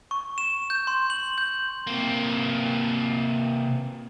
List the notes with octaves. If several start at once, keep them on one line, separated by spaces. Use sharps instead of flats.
C#6
E7
G6
C6
F#7
G6
C3 A#3